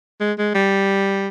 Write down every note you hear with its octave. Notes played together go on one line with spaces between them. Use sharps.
G#3
G#3
G3